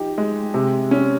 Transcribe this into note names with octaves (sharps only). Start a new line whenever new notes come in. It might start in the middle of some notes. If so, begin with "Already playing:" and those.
Already playing: F3 D#4 G4
G#3
C3
C#4